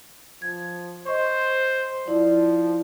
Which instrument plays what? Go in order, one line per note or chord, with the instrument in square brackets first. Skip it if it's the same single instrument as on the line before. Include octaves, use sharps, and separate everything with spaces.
[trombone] F3 [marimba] G#6
[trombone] C5 [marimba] D#5 C#6
[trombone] F3 [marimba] E4 D5